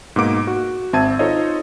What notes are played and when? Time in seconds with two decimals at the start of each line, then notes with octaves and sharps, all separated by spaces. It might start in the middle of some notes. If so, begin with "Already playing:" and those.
0.16 G#2 B2 A#3 D6 D7
0.47 F#4
0.93 G#1 C4 E5 A5 G#6 D#7
1.19 D#4 F4 A4 C5 C#5 D#5